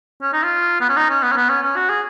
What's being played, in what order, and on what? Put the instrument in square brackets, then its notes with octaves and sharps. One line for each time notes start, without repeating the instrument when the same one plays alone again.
[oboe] C#4
D#4
F4
B3
C#4
D#4
C#4
B3
C#4
B3
C#4
C#4
F#4
G#4